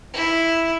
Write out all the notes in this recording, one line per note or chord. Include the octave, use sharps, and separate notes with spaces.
E4